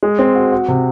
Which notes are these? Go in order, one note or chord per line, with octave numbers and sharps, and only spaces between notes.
G#3
C4
F#4
F#4
C3